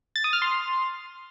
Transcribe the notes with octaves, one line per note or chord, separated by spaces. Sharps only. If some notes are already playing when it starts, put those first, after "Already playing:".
A6
D#6
F6
C6